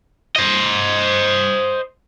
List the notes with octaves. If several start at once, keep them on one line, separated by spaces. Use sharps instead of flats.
C5 D#5